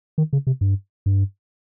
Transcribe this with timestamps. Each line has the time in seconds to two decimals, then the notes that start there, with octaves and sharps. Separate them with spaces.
0.18 D#3
0.33 C#3
0.47 C3
0.61 G2
1.06 G2